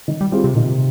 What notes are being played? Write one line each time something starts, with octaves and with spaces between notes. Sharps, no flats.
D#3
G3
G3 C4 F4 G#4
C3
A#2 D#3
C3